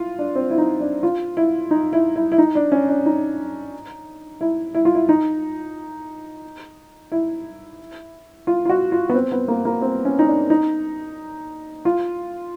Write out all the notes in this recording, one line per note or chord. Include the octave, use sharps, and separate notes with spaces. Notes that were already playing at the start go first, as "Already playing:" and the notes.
Already playing: E4 F4
D4
C4
E4
D#4
D4
F4
E4
D#4
E4
E4
E4
D#4
D4
C#4
D4
D#4
E4
E4
F4
E4
D#4
E4
F4
F4
F#4
F4
B3
C4
B3
A#3
A#3
C4
C#4
D#4
D4
D#4
F4